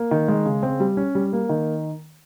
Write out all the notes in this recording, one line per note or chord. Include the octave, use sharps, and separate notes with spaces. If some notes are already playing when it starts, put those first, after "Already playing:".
Already playing: A#3
D#3
G#3
C#3
C4
G3
C#4
G3
A#3
D#3